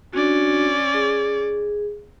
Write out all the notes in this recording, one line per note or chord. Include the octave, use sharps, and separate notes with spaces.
C#4 D4 F#4 D5
G#4